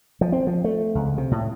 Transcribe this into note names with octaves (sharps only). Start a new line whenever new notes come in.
F3
C4
F3
A3
C#2
C3
A2